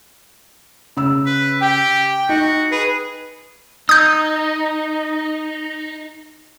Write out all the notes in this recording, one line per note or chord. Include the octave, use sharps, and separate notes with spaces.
C#3 E6
B4
G4 G5
D#4 F#4
G#4 B4
D#4 D#6 G6